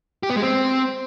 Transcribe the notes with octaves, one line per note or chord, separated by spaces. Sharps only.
G4
B3
G#3
C4